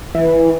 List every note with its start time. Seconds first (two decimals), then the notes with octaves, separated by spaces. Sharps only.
0.15 E3